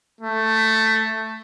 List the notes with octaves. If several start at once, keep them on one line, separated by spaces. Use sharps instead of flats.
A3